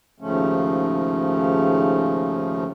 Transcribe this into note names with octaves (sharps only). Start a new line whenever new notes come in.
D#2 G#2 C#3 F3 A3 C#4